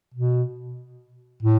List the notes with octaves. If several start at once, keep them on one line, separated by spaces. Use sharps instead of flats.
B2
A2